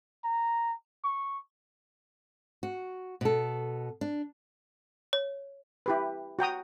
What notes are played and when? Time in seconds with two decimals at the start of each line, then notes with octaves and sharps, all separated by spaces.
0.24 A#5
1.04 C#6
2.63 F#4
3.21 B2 A4
4.01 D4
5.13 C#5
5.86 E4 G4 B4
6.39 F#4 G5 A#5 D#6